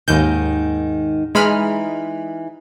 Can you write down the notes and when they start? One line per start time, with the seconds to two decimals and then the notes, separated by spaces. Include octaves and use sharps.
0.08 D#2 G#2 D#3 G6
1.35 E3 G#3 D#4 B5 F6